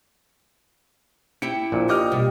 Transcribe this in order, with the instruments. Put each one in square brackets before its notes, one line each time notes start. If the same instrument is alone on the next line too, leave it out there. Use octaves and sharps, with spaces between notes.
[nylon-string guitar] E4 G4 G5 [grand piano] C#7
[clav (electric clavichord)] A#1 A#2
[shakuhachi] G4 [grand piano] D#5 D6 F6
[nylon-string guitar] B2 G3